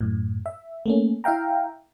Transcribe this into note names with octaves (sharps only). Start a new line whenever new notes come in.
F#2 A2
E5
A3 A#3 C#4
E4 E5 F5 G5 A#5